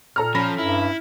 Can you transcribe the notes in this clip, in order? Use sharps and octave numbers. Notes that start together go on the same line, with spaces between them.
A#2 A4 A#5 F6
F3 C#4 B5 A#6
G2 E4